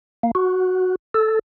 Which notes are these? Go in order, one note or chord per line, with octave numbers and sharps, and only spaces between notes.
A#3
F#4
A4